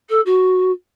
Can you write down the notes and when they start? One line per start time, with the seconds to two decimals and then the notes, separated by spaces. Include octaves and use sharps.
0.09 A4
0.25 F#4